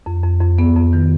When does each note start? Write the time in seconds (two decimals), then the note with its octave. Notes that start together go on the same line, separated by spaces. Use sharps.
0.06 F2
0.23 F2
0.41 F2
0.59 B3
0.76 F2
0.93 D#3